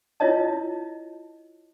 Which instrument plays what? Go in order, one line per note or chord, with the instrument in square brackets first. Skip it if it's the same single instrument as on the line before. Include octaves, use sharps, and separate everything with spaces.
[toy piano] E4 F4 C#5 D#5 A5